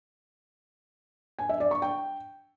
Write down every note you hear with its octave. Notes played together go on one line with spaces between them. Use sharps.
G#5
E5
D5
C#6
G5